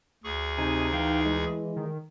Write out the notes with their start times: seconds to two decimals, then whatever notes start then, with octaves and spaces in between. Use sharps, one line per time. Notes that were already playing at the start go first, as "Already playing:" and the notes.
0.24 D2 G#4 C#6
0.58 C3 D#4 G#5
0.93 E3 F5 G5
1.26 G#3
1.76 D#3